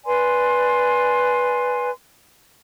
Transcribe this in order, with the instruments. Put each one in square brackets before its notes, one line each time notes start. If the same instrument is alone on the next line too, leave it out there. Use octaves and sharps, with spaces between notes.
[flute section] B4 D5 G#5 C6